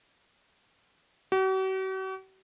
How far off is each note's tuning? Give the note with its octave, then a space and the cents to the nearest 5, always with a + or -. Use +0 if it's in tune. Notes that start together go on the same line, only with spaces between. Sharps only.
F#4 +45